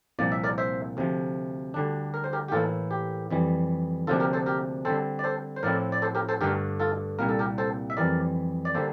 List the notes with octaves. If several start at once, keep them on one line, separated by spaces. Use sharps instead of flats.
C2 A#2 F3 A#3 D5
E5
A#4 D5
C5 E5
D2 C3 F3
D2 D3 G3 D4
A#4
C5
G4 A#4
G4
A2 E3 A#3 E4 F4 A4
G4
F2 E3 G3
D2 C3 F3 A#3 D4 F4 A4
G4 A#4
A4 C5
G4 A#4
D3 G3 C4 A4 C5
D5
A4 C5
C5
A2 F3 C4 E4 A#4 D5
D5
A4 C5
G4 A#4
A4 C5
G2 D3 A3 D4 G4 A#4
F4 A4
C2 A#2 G3 A#3 A#4
A4
G4 A#4
A4 C5
E5
F2 E3 G3 A#4 D5
D5
D3 G3 A#3 A4 C5